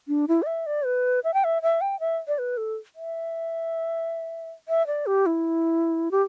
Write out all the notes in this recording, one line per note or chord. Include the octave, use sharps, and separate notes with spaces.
D4
E4
D5
E5
D5
B4
E5
G5
E5
E5
G5
E5
D5
B4
A4
E5
E5
D5
G4
E4
G4